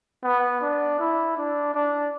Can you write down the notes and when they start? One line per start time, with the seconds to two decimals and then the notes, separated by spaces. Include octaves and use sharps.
0.23 B3
0.61 D4
0.99 E4
1.37 D4
1.74 D4